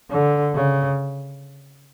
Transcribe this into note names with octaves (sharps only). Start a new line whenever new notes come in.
D3
C#3